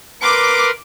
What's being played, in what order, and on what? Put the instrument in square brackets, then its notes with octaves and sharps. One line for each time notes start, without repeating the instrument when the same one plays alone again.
[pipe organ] A#4 B4 C6 [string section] D6